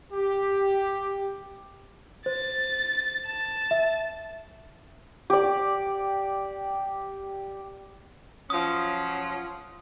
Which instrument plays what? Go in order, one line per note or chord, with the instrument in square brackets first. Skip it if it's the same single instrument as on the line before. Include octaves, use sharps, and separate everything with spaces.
[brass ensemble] G4
[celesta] C5 [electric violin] A6
[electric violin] A5
[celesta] E5
[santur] G4 D5
[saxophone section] F3 F#3 C#4 [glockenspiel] D#6